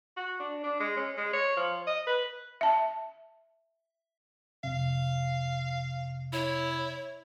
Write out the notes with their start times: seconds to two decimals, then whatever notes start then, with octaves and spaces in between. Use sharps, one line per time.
0.17 F#4
0.40 D4
0.63 D4
0.80 G#3
0.96 C#4
1.17 G#3
1.33 C#5
1.56 F3
1.87 D#5
2.06 B4
2.61 E5 A5
4.64 F2 C3 F5
6.33 E4 C#5